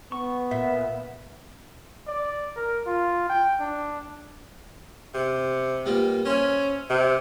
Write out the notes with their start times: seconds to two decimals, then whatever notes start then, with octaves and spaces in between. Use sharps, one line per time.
0.12 B3 C#6
0.51 A#2 E5
2.07 D5
2.56 A#4
2.86 F4
3.29 G5
3.60 D4
5.14 C3
5.86 A#2 G3 B3
6.25 C#4 C5 E5
6.90 C3